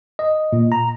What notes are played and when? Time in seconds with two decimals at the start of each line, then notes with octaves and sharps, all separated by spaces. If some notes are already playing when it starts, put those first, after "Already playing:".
0.19 D#5
0.53 A#2
0.72 A#5